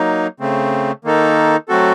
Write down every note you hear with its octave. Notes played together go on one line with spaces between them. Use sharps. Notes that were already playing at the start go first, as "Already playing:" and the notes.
Already playing: F#3 A#3 D#4
C#3 A3 C4
D#3 A#3 D#4 A4
F#3 A3 C4 F#4 A4